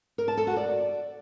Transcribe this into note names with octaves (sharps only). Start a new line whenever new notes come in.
A#4
A5
A4
F#4
D5